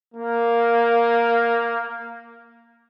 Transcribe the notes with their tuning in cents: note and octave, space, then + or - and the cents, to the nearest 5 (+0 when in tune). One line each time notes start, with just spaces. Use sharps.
A#3 +0